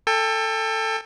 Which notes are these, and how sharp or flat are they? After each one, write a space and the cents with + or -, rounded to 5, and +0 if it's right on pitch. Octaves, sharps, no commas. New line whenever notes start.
A4 +15 G5 +40